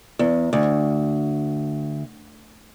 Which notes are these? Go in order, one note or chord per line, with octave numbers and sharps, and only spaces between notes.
E2
D2